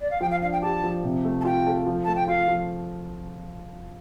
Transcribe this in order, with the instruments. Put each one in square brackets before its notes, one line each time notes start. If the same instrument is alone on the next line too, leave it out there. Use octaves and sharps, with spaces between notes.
[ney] D5
F5
[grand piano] F3 [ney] G5
[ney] F5
[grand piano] D4 [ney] F5
[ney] G5
[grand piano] G4 [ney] A5
[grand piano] F3
C3
A3
[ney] A5
[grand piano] F4 [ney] G5
[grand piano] A4
F3
[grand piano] A3 [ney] A5
[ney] G5
[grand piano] F4 [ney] F5
[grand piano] F3